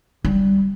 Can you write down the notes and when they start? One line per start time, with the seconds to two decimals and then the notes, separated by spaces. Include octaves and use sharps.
0.25 G3